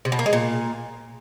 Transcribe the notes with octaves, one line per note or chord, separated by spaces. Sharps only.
C3
B2
A#3
G#3
A#2